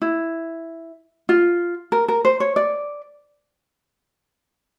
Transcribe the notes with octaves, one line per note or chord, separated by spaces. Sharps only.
E4
F4
A#4
A#4
C5
C#5
D5